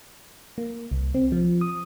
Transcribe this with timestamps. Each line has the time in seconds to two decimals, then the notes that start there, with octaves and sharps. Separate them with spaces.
0.58 A#3
0.91 C2
1.14 C4
1.32 F3
1.61 D#6